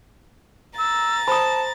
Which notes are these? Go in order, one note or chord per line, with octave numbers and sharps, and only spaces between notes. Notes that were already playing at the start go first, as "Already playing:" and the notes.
A#5 E6 A6
C5 A5 B5 D#6